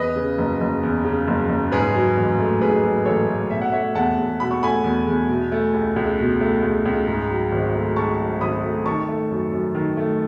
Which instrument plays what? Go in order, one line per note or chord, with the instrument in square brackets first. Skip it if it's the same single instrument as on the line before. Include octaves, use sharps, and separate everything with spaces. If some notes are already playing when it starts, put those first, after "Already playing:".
Already playing: [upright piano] E2 B4 D#5
C#3
F#1
F#1
E2
C#3
F#1
F#1
G#2 G#4 B4
F#3
A1
A3
G#2 G#4 B4
F#3
A1 A4 C#5
A3
B2 E5
F#5
A3 C#5 E5
E2 F#5 A5
E2
B2 B5
C#6
A3 G#5 B5
E2
E2
B2
A3
C#2
C#2
B2
A3
C#2
C#2
G#2
F#3
G#1
A3
G#2 A5 C#6
F#3
G#1 B5 D#6
A3
D#3 A5 C#6
A3
F#2
F#2
D#3
A3